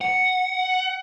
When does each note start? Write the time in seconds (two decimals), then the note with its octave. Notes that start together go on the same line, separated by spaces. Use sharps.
0.01 F#5